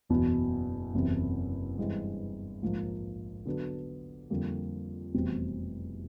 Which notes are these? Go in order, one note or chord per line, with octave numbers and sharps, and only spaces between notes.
F#1 E2 B2
F#1 E2 C3
G2 E3 G#3 C4
A#1 G#2 F3 A#3
D3 F#3 B3 D4
F2 D3 G3 A#3
F1 E2 B2 G3 C4